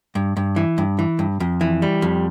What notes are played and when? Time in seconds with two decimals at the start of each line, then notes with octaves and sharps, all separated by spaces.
0.15 G2
0.36 G2
0.56 E3
0.78 G2
0.99 E3
1.19 G2
1.40 F2
1.61 E3
1.82 G3
2.02 F2